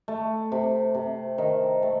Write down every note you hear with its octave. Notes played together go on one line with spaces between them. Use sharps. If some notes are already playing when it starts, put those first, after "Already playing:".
A3
C3
C3
D#3
A3